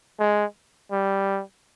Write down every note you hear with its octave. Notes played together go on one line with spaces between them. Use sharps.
G#3
G3